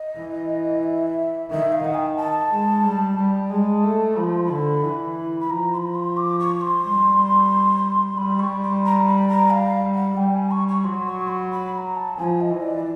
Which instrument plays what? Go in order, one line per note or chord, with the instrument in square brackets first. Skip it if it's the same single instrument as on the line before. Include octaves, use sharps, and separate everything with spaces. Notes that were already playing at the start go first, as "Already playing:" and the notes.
Already playing: [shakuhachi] D#5
[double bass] E3
[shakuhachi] E5
[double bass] D#3 [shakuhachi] E5
[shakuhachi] F5
[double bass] D#3 [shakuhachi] F#5
[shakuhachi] G#5
G5
A5
[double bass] G#3
G3
G3
[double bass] G#3 [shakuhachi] A5
[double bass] A3
[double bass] F3 [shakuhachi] B5
[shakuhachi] C6
B5
[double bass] D3
E3
[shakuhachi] B5
[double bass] F3 [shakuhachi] A#5
[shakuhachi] C6
B5
C6
D6
C#6
C6
[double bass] G3
[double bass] G3 [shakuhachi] B5
[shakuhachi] C#6
C6
A#5
B5
A#5
F5
F#5
[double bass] G3 [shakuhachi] G5
[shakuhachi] G#5
C#6
C#6
[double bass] F#3 [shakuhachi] C6
[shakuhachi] C#6
B5
B5
B5
A#5
A5
[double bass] F3 [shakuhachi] G#5
[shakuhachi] D#5
[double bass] E3
[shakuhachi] D5